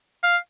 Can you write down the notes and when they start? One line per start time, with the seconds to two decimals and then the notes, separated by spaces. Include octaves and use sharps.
0.23 F5